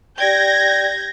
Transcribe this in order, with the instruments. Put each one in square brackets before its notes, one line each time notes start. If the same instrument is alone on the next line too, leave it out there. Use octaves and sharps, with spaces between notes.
[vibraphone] G4 D5 G5 [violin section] G6 G#6 A#6